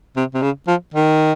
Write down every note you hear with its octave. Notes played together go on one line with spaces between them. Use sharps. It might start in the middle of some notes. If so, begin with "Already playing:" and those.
C3
C3
C#3
F3
D#3